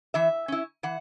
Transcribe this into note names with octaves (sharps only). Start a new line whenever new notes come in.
E3 E5
C#4 E4
E3 F#5